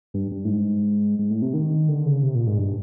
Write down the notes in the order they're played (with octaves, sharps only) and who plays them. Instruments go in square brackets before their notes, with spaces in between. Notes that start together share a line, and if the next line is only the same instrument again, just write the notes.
[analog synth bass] G2
G2
A2
G#2
G#2
A2
C3
D#3
D3
C#3
C3
A#2
G#2
G2